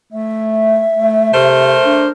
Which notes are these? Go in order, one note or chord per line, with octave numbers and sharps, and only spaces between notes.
A3 E5
A3
C3 A3 A#4 C5
D4